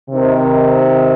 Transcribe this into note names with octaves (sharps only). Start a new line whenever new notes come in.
C3 D#3